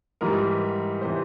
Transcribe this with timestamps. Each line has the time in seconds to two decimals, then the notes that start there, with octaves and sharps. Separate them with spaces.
0.21 G#2 E3 G3 A#4
1.01 C3 E3 C5